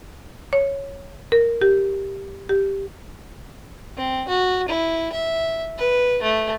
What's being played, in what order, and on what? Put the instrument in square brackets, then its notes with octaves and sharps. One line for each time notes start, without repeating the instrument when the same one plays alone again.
[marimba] C#5
A#4
G4
G4
[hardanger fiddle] C4
F#4
E4
E5
B4
A3